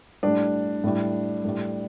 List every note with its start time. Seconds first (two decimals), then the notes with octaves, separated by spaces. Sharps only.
0.23 A2 G3 D4
0.84 A2 G3
1.44 A2 G3